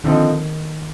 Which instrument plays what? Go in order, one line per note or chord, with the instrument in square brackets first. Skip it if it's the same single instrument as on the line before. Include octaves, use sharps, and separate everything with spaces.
[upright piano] D3 F3 C4 D#4 [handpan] D#3